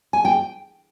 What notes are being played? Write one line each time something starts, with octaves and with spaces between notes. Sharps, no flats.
G#5
G5